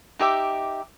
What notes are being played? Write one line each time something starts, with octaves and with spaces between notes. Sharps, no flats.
D#4 G4 E5 D6